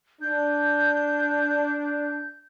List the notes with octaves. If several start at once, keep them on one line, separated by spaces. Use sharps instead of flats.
D4 G6